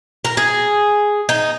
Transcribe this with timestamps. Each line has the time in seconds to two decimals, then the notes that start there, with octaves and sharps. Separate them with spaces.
0.25 A#4
0.37 G#4
1.29 D#4